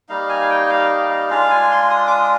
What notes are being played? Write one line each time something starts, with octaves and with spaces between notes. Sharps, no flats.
G3 A#3 D#4 F5
G#5
F5
G5
F5
F5
F5
G#3 D4 F4 F5
G#5
C6
D#6
D6
D#6